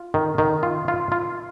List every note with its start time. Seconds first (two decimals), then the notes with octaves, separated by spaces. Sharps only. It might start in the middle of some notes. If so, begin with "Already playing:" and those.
Already playing: F4
0.14 D#3
0.38 D#3
0.63 F4
0.88 F4
1.12 F4